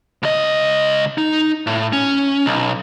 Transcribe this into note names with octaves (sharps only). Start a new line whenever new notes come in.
C#2 D#5
D#4
A2
C#4
B1